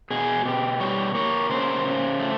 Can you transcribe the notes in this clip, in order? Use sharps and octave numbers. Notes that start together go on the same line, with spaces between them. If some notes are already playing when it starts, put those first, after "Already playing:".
B2 G#4
B2 G4
G3 C#5
A#3 C#5
C#3 C5
C#3
A3